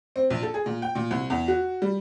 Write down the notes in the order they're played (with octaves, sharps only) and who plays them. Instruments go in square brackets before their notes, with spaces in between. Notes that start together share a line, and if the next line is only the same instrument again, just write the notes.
[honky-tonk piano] C4
A#1
A4
G#4
A#2
G5
A#2
C2
E2
F#4
G3